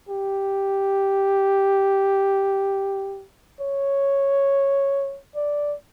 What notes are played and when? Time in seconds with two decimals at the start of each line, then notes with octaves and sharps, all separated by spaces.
0.09 G4
3.60 C#5
5.36 D5